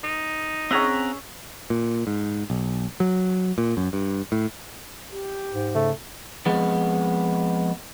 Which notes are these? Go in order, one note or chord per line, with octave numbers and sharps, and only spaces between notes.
D#4
C4 C#4 G#4 E5 F#5 A#5
A#2
G#2
B1
F#3
A#2
F#2
G2
A2
G4
G#2
C#3 A3
F2 G#3 B3